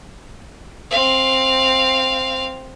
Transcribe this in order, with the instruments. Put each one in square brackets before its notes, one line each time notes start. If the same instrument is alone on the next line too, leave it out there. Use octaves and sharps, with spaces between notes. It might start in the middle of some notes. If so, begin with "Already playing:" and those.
[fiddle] C4 F5